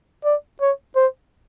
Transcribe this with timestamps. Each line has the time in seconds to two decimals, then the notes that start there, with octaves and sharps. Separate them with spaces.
0.25 D5
0.61 C#5
0.96 C5